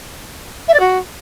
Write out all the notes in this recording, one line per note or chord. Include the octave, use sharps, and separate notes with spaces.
E5
D5
F#4